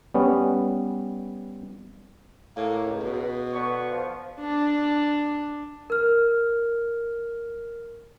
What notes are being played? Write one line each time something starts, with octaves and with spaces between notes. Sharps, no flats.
G3 B3 C#4
A2 A#3
C#2
B2
D3 B3 C#6
F3
D4
A#4 F6